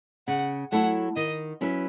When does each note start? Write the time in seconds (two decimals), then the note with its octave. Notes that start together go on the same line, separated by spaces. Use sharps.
0.28 C#3 F#5
0.72 F#3 A3 E4 F#5
1.16 D#3 D#5
1.61 F#3 C#4 E4 B4